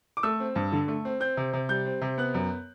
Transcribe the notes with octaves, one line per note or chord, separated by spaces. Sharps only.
D6
A3 E6
C4
G2
D3
A3
C4
C4 G6
C3
C3
G3 G6
C4
C3
B3 F#6
F#2